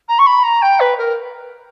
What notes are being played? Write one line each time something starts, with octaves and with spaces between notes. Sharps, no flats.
A#5
C#6
B5
A#5
G5
B4
A#4